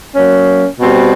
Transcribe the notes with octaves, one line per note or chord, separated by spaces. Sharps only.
F#3 A#3 C#4
B2 G3 C4